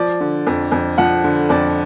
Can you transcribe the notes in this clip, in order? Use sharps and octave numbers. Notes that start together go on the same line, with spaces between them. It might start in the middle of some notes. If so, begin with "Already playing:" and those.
Already playing: F3 D5
D3
F2
F2
F3 F#5
D3
F2 D5